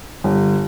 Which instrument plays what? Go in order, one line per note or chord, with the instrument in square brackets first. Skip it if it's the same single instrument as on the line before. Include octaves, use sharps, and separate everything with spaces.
[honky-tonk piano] G1